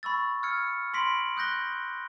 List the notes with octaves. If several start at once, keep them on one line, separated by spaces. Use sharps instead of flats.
B5 C#6 E6 A6
E6 F6 G#6 C#7
B5 C6 A#6 B6 D7 F#7
D#6 F#6 G6 A#6 G7